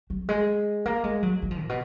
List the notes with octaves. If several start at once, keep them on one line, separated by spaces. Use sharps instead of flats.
F#3
G#3
A#3
G#3
F#3
F#3
F3
A#2
B2